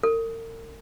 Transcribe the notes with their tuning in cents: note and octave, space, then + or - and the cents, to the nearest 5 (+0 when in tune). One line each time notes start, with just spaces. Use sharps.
A#4 -40